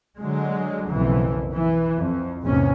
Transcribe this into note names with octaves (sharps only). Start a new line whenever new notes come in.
D3 F#3 G#3
F#1 B1 F2 E3
E3
F2
A#1 E2 G#2 C3 C#4